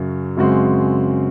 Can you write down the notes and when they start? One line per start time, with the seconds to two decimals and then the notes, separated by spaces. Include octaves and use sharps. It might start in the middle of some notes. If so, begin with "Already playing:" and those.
Already playing: F#2 C#3 F#3 C#4
0.37 F#2 C#3 G#3 C4 F#4